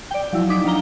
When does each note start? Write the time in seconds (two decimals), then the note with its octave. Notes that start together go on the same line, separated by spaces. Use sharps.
0.11 D5 G5
0.33 F3 F#3 E4
0.49 F3 D#4 D6 B6
0.64 F#3 D4 F5 A#5 G7